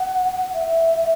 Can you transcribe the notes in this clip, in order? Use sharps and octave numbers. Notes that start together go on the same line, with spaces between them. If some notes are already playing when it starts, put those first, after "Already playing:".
Already playing: F#5
E5